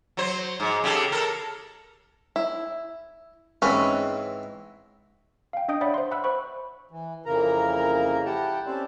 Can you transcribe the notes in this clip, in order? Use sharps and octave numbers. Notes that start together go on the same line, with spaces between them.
F#3 C5
G#2
C#3 G4 A4
A4 A#4
E4
G#2 E3 C4 C#4 B4
F5 G5
D4 D#5 D#6 G6 D7
C#5 D5 E5 F#5 B5
C5 C6
E5 F#5 B5 E6 F#6
C5 B5 C#6
E3
F2 C#3 E3 A#3 A#4 A#5
E4 G4 F#5 G5 A5
C4 C#4 G4 A4 C5 D5